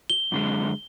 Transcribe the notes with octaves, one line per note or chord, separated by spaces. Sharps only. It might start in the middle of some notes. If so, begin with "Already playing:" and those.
G7
F#2 D3 G#3